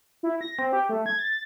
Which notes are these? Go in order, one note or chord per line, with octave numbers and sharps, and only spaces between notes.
E4
A#6
C4
G4
A3
G#6
A6